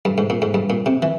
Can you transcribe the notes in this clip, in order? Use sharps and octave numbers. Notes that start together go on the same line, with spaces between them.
G2
G#2
A#2
G#2
G2
A#2
C3
E3